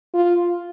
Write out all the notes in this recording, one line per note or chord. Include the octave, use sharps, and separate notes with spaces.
F4